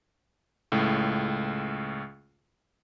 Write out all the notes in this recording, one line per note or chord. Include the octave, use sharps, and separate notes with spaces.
C#2 A2